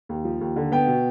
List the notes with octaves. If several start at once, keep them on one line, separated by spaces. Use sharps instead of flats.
D#2
F3
D#2
D3
B3 G5
B2